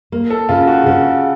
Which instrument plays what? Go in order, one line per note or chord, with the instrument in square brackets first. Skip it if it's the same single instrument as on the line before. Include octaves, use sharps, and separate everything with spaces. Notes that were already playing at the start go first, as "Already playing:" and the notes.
[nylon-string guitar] A#3
[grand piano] A4
[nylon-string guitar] C#3 [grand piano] F4
[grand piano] F#4
[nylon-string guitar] C#3